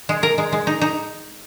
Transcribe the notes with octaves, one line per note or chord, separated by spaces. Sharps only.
G#3
A#4
G#3
G#3
D#4
D#4